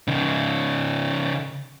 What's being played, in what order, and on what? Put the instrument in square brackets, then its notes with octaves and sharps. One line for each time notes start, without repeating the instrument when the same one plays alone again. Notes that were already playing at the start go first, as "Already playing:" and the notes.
[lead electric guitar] C#3 D#4